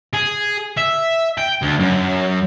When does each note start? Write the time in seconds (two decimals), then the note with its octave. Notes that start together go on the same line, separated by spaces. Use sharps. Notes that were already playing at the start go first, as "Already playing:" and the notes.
0.13 G#4
0.77 E5
1.38 G5
1.62 D2
1.80 F#2